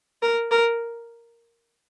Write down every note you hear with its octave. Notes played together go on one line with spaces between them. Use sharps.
A#4
A#4